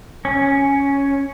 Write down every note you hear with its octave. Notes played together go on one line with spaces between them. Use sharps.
C#4